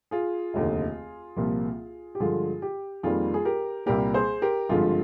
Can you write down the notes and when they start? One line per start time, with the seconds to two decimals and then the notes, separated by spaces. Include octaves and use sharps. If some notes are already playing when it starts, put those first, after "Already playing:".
0.11 F4 G#4
0.54 F1 D#2 D3
1.36 C2 A#2 F3 A#3
2.15 G4
2.20 G2 D3 F3 G#3 F4 G#4
2.62 G4
3.03 F2 D#3 G3 A#3 F4 G#4
3.34 G#4
3.45 G4 A#4
3.86 C2 A#2 G3 A#3 G4 A#4
4.14 G#4 C5
4.42 G4 A#4
4.69 G#1 G2 D3 F3 G#3 F4 G#4